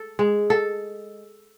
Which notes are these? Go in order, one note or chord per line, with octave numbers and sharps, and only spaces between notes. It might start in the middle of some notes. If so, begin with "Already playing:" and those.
Already playing: A4
G#3
A4